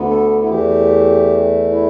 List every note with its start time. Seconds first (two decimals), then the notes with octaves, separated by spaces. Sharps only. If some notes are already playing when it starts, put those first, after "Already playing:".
Already playing: D2 D3 B3
0.09 A4
0.43 E4
0.50 E2 E3 A3 G4
1.71 E4